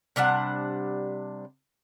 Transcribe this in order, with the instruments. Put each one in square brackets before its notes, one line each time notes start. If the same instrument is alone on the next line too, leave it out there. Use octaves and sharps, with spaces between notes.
[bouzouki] C3 G3 D4 F#5